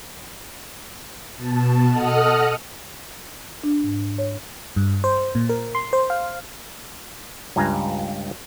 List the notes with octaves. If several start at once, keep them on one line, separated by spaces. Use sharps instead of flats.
B2 A5
A4 D#5 F#5 D#6 F6 F#6
D4
G#2
C#5
G2
C5
A#2
A#4
C6
C5
F5
C#2 G2 F4 G#5 A#5